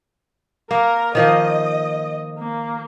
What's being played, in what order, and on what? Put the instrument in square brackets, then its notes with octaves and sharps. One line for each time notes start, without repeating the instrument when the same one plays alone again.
[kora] A#3 [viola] A#4
[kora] D#3 F3 A#3 [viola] D#5
[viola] A#3